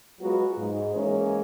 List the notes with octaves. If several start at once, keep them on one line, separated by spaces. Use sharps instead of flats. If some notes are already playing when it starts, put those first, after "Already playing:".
F#3 G#3 B3 F4 F#4
G#2
E3 G#3 A#3 C#4